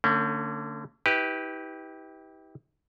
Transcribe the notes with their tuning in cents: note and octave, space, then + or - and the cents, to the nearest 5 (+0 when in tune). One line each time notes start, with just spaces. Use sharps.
D3 +0 A3 +45 C#4 +0
E4 -45 G4 +0 B4 +0